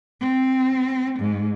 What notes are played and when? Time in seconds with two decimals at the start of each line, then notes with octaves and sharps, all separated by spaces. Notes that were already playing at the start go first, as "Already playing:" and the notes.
0.21 C4
1.19 G#2